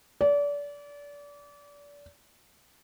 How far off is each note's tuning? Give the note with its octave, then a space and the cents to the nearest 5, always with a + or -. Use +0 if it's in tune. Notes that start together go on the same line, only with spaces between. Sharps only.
D5 -30